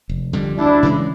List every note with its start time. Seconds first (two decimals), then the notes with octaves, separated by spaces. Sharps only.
0.09 F1
0.33 F2 D3 G3
0.58 D2 D4 E4
0.83 C#3 E3 G#3